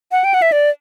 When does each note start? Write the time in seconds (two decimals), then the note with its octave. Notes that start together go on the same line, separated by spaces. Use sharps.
0.12 F#5
0.24 G5
0.34 F#5
0.42 E5
0.52 D5